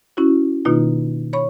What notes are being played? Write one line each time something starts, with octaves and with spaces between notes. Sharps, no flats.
C#4 E4 F#4
B2 D#3 A#3 D#4 F4
C#5 B5 C#6